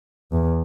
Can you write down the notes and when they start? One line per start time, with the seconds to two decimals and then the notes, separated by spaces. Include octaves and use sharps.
0.32 E2